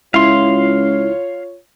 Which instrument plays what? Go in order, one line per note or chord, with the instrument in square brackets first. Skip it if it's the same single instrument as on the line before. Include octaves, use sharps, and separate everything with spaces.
[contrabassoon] C#2 [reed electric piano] E4 [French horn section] F4 C#5 [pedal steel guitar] F5 C6